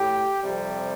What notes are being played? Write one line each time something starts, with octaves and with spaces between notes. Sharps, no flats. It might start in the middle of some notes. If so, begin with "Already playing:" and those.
Already playing: A2 G4
F2 C3 G3